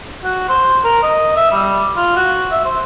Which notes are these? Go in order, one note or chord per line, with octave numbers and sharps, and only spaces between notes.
F#4
C5
A#4
D#5
E5
G3
F4
F#4
E5
C5